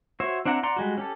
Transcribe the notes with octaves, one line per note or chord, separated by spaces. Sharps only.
F#4 C5 C#5 E5
C4 D4 E4 F#5 A#5
D5 F#5 A#5 C6
G3 G#3 F#4
C#4 G4 A4